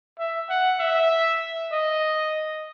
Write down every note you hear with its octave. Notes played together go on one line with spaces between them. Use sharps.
E5
F#5
E5
D#5